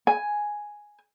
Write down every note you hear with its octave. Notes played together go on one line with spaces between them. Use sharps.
G#5